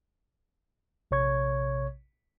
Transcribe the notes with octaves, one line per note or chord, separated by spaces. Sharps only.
A#1 C3 C#5 C#6 G#6